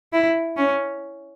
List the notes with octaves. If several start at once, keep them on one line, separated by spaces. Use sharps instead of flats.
E4
C#4